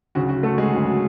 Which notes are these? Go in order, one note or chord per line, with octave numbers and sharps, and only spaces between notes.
D2 C#3 F#3 F#4
F#4
A3 A4
G#3 G#4
D2 C#3 F#3